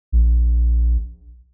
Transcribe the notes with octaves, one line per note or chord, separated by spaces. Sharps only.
A#1